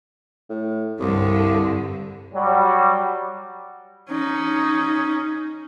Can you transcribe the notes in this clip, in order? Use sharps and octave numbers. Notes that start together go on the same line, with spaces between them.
A2
C2 G2 D3
F#3 G3
C#4 D#4